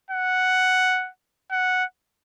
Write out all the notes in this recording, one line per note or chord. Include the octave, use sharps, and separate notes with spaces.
F#5
F#5